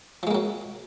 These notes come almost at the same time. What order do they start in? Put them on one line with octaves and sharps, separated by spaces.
F3 G#3 A#3 F#3